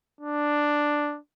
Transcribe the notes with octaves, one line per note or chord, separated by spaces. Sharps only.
D4